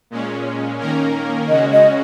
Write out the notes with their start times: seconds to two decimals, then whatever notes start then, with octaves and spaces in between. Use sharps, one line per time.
0.10 A#2 G#3 C#4
0.80 D#3 A#3 C#4 A#4
1.48 C#3 G#3 C#4 F#4 D#5
1.72 D#5